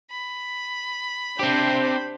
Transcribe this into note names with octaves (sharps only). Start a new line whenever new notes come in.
B5
C4 D4 G4 C5